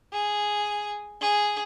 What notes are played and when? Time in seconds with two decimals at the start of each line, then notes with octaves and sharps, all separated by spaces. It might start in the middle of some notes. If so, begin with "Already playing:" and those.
0.13 G#4
1.21 G#4